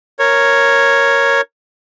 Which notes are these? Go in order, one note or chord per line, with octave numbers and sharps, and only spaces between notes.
A#4 C#5